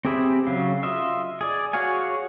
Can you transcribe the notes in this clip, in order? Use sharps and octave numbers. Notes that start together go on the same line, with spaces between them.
C4 G4 G#4 E5 B5
C#3 F#3 F5
F4 D#5 E5
G#4 D5
F#4 G#4 C#5 F5 G#5